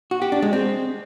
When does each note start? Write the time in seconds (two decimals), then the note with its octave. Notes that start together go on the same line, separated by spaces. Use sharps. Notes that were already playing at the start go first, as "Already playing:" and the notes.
0.11 F#4
0.22 G4
0.32 D4
0.42 G#3
0.53 C4